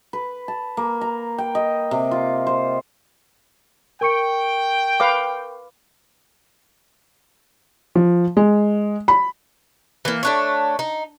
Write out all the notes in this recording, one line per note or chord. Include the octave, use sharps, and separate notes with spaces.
B4
A5
A#3
A#5
G5
D#5
C3
F4
C5
A#4 G5 C#6 C#7
B4 F5 D6
F3
G#3
B5
E3 A#3
A3 D4 C#5
D#4